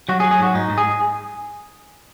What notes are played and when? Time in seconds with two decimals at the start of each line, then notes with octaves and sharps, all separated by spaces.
0.09 F#3 F#4
0.20 G#4
0.24 F#3
0.31 G#4
0.39 G#2 F#4
0.54 G#2 D#4
0.70 G#2
0.78 G#4